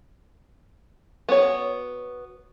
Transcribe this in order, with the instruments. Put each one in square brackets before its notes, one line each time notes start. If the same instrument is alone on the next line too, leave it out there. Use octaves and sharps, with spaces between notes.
[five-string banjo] B3 F#4 C#5